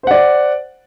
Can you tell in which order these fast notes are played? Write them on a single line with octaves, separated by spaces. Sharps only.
C5 F#5 D5